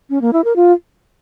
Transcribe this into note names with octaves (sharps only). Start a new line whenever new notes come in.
C#4
A#3
E4
A#4
F4